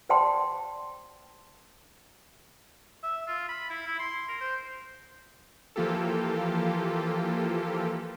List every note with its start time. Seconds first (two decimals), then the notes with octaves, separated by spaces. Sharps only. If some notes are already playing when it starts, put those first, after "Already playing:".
0.09 C5 D5 F#5 G5 A5 C6
3.03 E5
3.28 F4
3.49 B5
3.70 E4
3.87 E4
3.99 C6
4.29 A#4
4.41 C5
5.76 E3 F3 A#3 F4 G4 A4